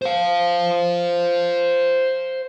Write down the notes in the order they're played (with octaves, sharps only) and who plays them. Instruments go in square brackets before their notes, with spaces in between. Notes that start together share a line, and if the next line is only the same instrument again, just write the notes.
[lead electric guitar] C5 F5